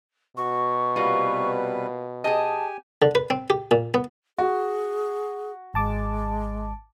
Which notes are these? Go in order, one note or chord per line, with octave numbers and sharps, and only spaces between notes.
B2 F#4 C#6
C3 G3 A#3 B3 F4 B4
G4 G#4 D#5 G#5 A5
D3
B4
C4
G4
A#2
B3
F#4 G#4
G#1 G#3 A5 D6